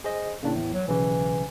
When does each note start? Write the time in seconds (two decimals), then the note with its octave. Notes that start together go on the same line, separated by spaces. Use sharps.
0.04 G#4 C5 D#5
0.43 A2 C#3 A#3 D4
0.55 E2
0.73 F#3
0.88 B1 C#3 E3